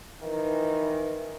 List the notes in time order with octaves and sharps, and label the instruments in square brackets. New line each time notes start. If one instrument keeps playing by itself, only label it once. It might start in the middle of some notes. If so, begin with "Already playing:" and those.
[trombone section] D#3 E3